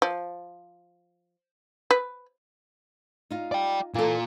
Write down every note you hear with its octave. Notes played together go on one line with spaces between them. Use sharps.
F3
B4
D#4 F4
D5 G5
A#2 E3 F4 A4